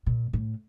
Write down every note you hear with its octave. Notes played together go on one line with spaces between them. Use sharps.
A#2
A2